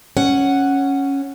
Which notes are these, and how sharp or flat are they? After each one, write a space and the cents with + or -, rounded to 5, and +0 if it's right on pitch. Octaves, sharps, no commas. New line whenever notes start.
C#4 -5 F#5 +0